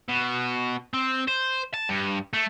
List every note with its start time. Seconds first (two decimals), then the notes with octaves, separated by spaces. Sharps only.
0.08 B2
0.94 C4
1.28 C5
1.74 A5
1.90 G2
2.34 A3